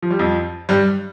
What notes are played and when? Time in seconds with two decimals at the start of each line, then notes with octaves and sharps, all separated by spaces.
0.02 F3
0.11 G3
0.19 F2 F3
0.69 G2 G3